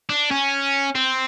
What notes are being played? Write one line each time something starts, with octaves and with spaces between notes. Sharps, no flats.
D4
C#4
C4